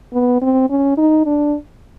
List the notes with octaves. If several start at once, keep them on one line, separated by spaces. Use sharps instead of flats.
B3
C4
C#4
D#4
D4